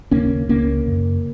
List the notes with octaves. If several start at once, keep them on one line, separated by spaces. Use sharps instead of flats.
D#2 C#3 A#3 C#4
C#2 C#3 A#3 C#4
F#2 C#3